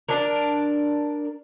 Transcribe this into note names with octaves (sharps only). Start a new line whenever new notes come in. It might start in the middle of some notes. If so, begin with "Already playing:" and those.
D4 A#4